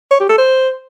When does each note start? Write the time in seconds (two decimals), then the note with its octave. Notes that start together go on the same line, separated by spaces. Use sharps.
0.11 C#5
0.20 G4
0.29 A4
0.38 C5